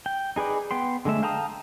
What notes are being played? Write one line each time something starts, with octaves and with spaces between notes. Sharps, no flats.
G5
D#4 G#4 B4 D5
B3 G5 C6
D3 G#3 A3 E5
F5 G5 A5 A#5 D#6